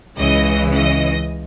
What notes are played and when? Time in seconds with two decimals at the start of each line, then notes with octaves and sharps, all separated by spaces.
0.16 C#2 C#3 E3 D#5
0.74 D#5